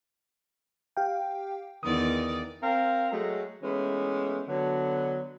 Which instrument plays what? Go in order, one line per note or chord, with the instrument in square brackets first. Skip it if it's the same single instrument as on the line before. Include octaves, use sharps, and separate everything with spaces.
[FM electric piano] G4 F5 G5
[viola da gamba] E2 D#3 D5 [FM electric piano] D#6
[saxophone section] C4 A#4 F5
F#3 G#3 A3
E3 G#3 A3 B3 C#4 D#4
D3 F#3 B3